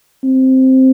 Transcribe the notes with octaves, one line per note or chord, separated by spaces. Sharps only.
C4